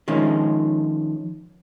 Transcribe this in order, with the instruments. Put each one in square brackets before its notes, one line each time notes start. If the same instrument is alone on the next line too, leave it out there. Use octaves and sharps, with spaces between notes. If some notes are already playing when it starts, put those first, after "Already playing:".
[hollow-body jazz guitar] D#3 F3 G#3 C#4